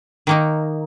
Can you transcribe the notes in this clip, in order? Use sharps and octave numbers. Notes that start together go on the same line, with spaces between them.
D#3 A#3 D#4